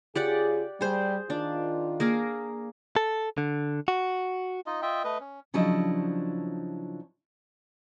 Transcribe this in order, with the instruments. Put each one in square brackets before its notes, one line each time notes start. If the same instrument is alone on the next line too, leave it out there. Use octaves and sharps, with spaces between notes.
[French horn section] C#3 F4 G#4 [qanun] G4 D5 F#5
[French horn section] G3 [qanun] G#4 C5
[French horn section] D#3 F4 [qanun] D4
[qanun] A#3 G#4 A#4
[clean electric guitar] A4
D3
F#4
[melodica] D#4 F4 D#5
F4 D#5 E5 G5
A3 B4 D#5
C#4
[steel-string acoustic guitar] C#3 F3 F#3 D4 E4 D#5